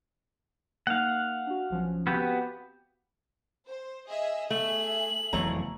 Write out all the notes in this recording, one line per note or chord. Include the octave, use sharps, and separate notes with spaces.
A#3 D#4 F5 F#5
D4 F#4
B1 F3 C#4
B3 C4 F#4 G4 F5
C5
G#4 D#5 E5
A3 G#4 E5 F#7
F#1 F2 E3 A3 C#5 A#5